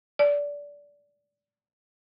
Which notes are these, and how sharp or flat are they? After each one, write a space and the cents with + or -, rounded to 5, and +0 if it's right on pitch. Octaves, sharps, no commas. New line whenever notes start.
D5 -20